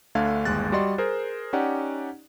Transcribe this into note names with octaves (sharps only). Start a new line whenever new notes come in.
D2 D3 A3 D4 F5 G#6
G1 D#2 G#3 F#6 A6
G3 F#4 D5 D#5 C6 A6
G#4 A#4 C5
C#4 D#4 G4 D5 F#5